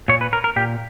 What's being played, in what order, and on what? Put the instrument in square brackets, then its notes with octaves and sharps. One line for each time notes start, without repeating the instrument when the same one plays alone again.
[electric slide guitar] A#2 C#5
B4
A#4
A#4
A#2 G4